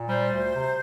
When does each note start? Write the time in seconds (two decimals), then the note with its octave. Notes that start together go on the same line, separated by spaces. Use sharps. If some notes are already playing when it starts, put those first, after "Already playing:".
Already playing: A#2
0.09 G3 C5
0.31 D2
0.54 C3